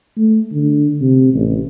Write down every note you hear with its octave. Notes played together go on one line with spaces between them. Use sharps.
A3
D3
C3
A1